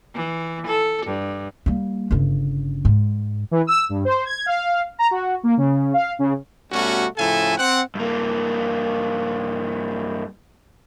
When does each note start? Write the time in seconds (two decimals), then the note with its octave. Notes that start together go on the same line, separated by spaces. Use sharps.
0.15 E3
0.67 A4
1.06 G2
1.66 G3 A#3
2.11 G1 C#3
2.85 G#2
3.51 E3
3.67 E6
3.89 G2
4.05 C5
4.25 G#6
4.46 F5
4.99 A#5
5.11 F#4
5.43 A#3
5.57 C#3
5.94 F5
6.19 C#3
6.72 B2 G3 A3 C#4 F#4
7.17 A2 C#3 F3 A4 E5 G#5
7.58 C4 F#5
7.95 G2 A#3